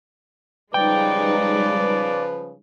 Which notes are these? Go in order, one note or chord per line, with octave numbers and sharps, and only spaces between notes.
C#3 F3 G3 G#3 D#4 B4 D5 G5